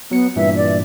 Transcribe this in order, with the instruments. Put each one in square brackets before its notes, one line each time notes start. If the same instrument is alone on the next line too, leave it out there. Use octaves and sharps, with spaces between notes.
[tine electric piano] F#3 C#7 [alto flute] B3
[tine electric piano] G2 A#2 E3 [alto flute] E5
[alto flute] D5